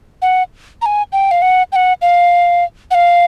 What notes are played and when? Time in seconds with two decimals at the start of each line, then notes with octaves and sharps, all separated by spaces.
0.22 F#5
0.82 A#5
0.86 G#5
1.13 G5
1.31 F5
1.42 F#5
1.72 G5
1.76 F#5
2.02 F5
2.91 F#5
2.95 F5